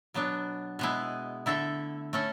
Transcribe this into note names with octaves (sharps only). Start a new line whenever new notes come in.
B2 F#3 B3 D4
B2 G#3 B3 E4 G#4
D3 A3 E4 A4 E5
A3 C#4 E4 A4